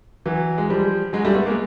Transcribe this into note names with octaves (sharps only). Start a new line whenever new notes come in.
E3 F#3
G#3
F3 G3
F#3 G#3
G3 A3
A3 B3
G#3 A#3